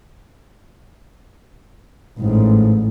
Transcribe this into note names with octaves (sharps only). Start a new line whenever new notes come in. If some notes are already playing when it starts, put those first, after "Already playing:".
A1 G#2